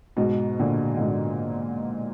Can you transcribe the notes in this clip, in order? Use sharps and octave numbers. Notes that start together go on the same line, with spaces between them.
G#2 B2
A#2 D3
D3
G#2 B2